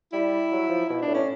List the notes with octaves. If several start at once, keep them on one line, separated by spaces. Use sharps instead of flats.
G3 E4
F#3
F3
B2 E4
D4
A2
C#4